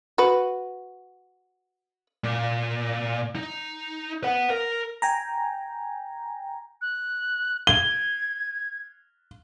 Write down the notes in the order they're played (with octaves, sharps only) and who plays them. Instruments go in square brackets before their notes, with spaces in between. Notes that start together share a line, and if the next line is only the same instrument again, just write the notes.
[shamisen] F#4 B4
[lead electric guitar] A#2
D#4
B4 F#5
A#4
[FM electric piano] G5 G#5 A#5
[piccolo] F#6
[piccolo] G#6 [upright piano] G7